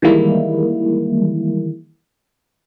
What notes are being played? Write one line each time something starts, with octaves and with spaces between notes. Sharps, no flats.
D#3 E3 G3 G#3 A#3 E4